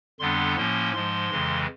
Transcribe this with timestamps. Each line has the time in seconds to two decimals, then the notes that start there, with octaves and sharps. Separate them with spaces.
0.19 F2 D3 G3 B3 D4 C6
0.56 A2 F3 A#3 C#4 C6
0.93 G#2 F3 G#3 C6
1.30 F2 C#3 E3 G#3